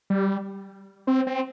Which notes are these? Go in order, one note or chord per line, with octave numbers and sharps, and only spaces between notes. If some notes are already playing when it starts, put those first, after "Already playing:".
G3
C4
C4